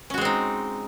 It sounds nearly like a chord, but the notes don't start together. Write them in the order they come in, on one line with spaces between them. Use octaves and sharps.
C#4 F#4 G#3 C4 D#4